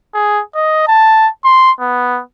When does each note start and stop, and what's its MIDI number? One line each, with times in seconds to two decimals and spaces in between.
0.14 0.41 68
0.55 0.85 75
0.88 1.28 81
1.45 1.71 84
1.80 2.20 59